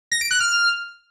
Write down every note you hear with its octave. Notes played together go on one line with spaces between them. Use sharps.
A#6
D7
F#6
F6